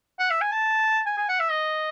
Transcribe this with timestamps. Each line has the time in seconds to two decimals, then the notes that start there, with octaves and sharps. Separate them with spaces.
0.19 F#5
0.30 E5
0.41 G#5
0.52 A5
1.06 G#5
1.17 G#5
1.29 F#5
1.39 E5
1.50 D#5